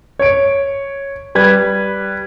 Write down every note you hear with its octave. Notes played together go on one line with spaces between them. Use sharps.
C#5 D7
G3 B4 G#6